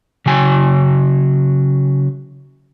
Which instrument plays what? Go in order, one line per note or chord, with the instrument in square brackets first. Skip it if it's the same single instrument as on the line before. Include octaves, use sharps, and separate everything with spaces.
[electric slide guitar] C#3 F#3 G#5